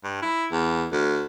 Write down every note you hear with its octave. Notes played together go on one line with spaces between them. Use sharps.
G2
E4
E2
D2